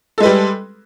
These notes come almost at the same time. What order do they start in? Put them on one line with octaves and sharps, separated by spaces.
A4 G#3 B4 G3